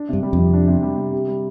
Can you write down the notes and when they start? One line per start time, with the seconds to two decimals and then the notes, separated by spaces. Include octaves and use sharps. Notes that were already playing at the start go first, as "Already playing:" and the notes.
Already playing: D4
0.09 G2 C3
0.23 G3
0.33 F2
0.38 C3
0.54 D4
0.67 C3
0.83 G3
0.98 C3
1.13 G4
1.28 G3